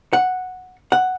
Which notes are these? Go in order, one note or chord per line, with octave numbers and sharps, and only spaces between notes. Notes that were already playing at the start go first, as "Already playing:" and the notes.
F#5
F#5